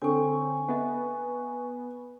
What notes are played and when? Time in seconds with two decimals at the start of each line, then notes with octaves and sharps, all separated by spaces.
0.02 D3 C4 A4 C#5 G#5 C#6
0.68 B3 D#5 E5 F#5